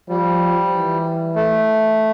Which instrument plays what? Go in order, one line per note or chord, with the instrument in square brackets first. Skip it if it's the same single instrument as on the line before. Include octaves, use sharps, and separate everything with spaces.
[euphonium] F3 [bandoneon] G3
[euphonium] E3
[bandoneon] A3